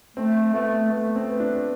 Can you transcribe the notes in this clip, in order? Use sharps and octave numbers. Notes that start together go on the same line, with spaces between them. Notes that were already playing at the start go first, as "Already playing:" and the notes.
A3 C4
A3 B3
A3 B3
C4
B4
D4